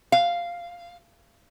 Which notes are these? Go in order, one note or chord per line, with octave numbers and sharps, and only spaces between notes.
F5